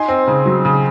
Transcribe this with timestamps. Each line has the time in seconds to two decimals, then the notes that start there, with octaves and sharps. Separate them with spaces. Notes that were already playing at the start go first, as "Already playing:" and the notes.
Already playing: D#4 G#5 C6
0.08 C4
0.27 C#3
0.45 F#3
0.65 C#3